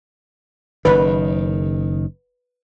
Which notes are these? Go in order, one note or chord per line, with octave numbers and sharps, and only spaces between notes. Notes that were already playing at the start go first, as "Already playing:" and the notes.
F#1 D#3 B4